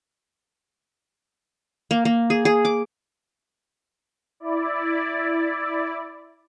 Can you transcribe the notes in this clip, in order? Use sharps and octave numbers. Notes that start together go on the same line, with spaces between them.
A#3
A#3
G#4
G#4
D6
E4 D5